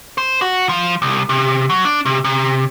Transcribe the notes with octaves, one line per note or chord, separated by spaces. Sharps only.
C5
F#4
F3
C2
C3
F#3
D4
C3
C3